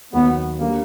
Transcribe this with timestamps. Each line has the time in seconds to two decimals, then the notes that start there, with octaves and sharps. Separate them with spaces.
0.13 D#2 D#3 F#3 B3
0.60 D3 G3 A#3